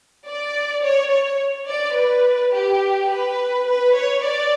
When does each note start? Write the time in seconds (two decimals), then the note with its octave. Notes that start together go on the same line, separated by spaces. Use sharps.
0.25 D5
0.82 C#5
1.10 C#5
1.67 D5
1.95 B4
2.53 G4
3.10 B4
3.67 B4
3.96 C#5
4.24 D5